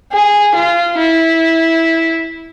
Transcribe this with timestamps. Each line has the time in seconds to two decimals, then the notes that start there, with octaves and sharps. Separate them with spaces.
0.12 G#4
0.55 F4
0.97 E4